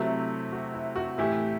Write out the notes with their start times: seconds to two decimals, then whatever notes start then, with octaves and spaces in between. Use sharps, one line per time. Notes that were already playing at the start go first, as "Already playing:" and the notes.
Already playing: C3 F#3 A3 E4 G4
0.52 F#4
0.74 E4
0.96 F#4
1.18 A2 E3 A3 E4 G4